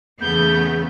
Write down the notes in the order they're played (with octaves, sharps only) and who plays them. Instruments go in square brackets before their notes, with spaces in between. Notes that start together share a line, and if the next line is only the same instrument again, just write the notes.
[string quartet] E2 C#3 [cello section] A3 B3 [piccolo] G6